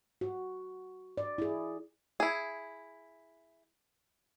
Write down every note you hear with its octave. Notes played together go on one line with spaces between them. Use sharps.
F#4
D5
E4 G#4
E4 G#4